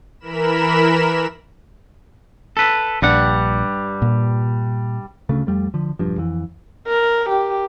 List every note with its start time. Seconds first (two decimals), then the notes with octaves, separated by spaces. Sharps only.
0.20 E3 A#4 B5 E7
2.57 A4 B4
3.02 A#1 G2 G3 D4 F#5
4.02 A#2
5.29 D2 C#3 A3
5.47 F2 G3 A3
5.74 D3 F3
5.99 E1 G2 F3
6.18 F2 E3
6.88 A#4
7.30 G4